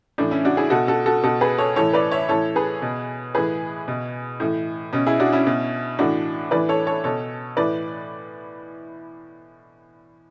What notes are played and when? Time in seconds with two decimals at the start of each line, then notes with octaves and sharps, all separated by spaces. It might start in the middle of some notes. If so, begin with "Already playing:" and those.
0.18 A2 E3 D4
0.31 C#4 E4
0.45 D4 F#4
0.57 E4 G#4
0.70 B2 F#4 A4
0.88 F#4 A4
1.06 F#4 A4
1.24 B2 F#4 A4
1.41 G#4 B4
1.58 A4 C#5
1.76 A2 E3 A4 C#5
1.93 B4 D5
2.12 C#5 E5
2.29 A2 E3 A4 C#5
2.56 G#4 B4
2.82 B2
3.35 A2 E3 G#4 B4
3.88 B2
4.40 A2 E3
4.93 B2 C#4
5.06 E4 G#4
5.20 D4 F#4
5.32 C#4 E4
5.47 B2
5.99 A2 E3 D4 F#4
6.51 A2 E3 B4 D5
6.69 A4 C#5
6.87 A4 C#5
7.04 B2 A4 C#5
7.57 A2 E3 B4 D5